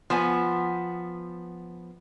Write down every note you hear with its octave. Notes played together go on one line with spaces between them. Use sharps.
F3 B3 G#5